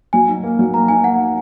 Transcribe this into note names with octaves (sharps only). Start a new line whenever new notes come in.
F#3 G#5
D#4
A#3
F#3
A#3 A#5
D#4 G#5
A#3 F#5